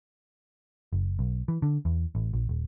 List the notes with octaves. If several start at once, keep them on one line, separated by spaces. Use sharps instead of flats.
F#1
B1
E3
D3
E2
A1
A#1
D#1